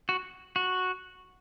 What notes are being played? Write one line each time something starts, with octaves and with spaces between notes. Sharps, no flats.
F#4
F#4